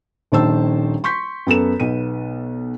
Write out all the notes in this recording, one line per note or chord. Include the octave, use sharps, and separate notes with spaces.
D#1 A#1 D#3 C5 A5 E6
C6 C#6 G6 B6
F#2 B3 A4 E7
B1 B3 D#7